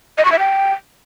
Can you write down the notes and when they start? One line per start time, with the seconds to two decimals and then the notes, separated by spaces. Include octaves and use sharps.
0.18 D#5
0.25 C#6
0.32 E5
0.39 G5